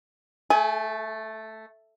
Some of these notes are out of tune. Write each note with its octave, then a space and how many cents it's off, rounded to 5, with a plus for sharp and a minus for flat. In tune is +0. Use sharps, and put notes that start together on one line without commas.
A3 +0 A4 -45 G#5 +0